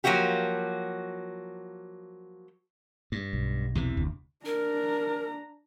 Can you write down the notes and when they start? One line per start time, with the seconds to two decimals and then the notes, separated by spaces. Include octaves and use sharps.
0.04 F3 F#3 A#3 E4 F#4 G4
3.12 G2
3.33 B1
3.75 E2 C3 E3
3.97 F1 D2
4.45 D4 A#4 A#5